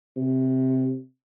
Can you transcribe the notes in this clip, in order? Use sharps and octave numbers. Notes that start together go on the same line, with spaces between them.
C3